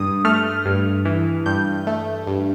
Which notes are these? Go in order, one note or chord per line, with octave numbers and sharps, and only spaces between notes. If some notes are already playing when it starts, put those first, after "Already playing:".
Already playing: G2 D#6
A3 F6
G2
E3
G2 G6
A3
G2